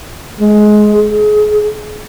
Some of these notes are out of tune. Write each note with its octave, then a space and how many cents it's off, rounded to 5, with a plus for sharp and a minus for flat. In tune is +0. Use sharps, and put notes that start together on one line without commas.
G#3 +20
G#4 +30